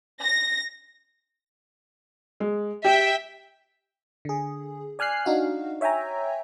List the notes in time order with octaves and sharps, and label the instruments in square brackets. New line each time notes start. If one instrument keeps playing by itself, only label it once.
[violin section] A#6
[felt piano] G#3
[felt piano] G4 [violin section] E5 G5
[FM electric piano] D3 G#4
D5 G#5 F6 F#6 C7
D4 D#4 F#4 F5
C#5 E5 G5 G#5 A#5